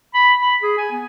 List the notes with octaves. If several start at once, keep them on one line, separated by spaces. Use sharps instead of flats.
B5
B5
G#4
G#5
B3